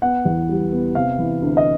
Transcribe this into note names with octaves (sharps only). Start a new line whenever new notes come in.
B3 F#5
E2
G3
B3
C3 F5
E3
D2
D#5